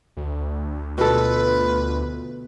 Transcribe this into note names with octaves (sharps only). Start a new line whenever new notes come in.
D2
B2 F4 A4 B4